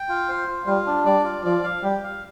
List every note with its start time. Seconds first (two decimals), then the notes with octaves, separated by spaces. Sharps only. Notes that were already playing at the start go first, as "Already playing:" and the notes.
Already playing: G5
0.09 F4
0.29 C5
0.48 F4
0.66 G3 F4
0.86 D4
1.05 G3 D5
1.25 F4
1.44 F3 D5
1.64 F5
1.83 G3 G4
2.03 F5